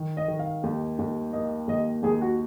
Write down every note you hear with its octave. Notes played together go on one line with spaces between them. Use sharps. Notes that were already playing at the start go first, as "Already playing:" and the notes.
Already playing: D#3
D#5
D#3
F5
D#2
D#2
A#3 D#5
D#2 D#5
D#2 G#4
F#4